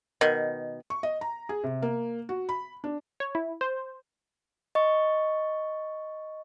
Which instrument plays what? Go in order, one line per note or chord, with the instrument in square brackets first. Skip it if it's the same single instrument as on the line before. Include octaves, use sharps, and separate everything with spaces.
[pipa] B2 D#3
[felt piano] C#6
D#5
A#5
G#4
C3
A#3
F#4
B5
D4
[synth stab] C#5
E4
C5
[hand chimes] D#5 C#6